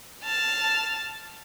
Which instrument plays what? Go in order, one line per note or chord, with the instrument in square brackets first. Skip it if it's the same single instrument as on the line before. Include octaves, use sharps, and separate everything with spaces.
[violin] A5 F6